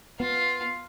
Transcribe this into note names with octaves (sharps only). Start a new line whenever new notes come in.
B3 F4 F5